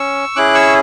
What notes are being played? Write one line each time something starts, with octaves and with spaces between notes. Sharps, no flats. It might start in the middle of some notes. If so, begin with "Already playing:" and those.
Already playing: C#4 C#6 E6
C#4 E4 G#4 D6 F#6
C#6 E6